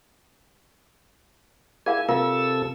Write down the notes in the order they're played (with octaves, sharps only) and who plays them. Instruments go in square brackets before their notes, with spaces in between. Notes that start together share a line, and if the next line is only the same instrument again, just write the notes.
[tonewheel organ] E4 G#5 [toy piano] G#4 A#4 F5
[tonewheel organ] C3 A4 E6 [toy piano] F4 A#4 F5